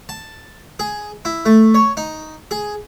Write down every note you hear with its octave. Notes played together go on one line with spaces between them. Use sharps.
A5
G#4
E4
A3
C#5
D#4
G#4